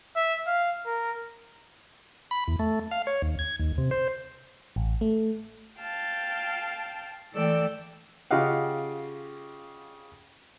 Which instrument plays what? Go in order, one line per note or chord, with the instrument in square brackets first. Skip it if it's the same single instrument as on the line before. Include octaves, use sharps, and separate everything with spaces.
[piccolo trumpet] E5
F5
A#4
[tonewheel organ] B5
E2
A3
F5
C#5
D#2
G#6
D#2
C3
C5
[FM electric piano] A1
A3
[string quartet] F5 G5 A5
E3 A3 A4 D5 G5 E6
[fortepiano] C#3 F4 G4 D#5 F5 F#5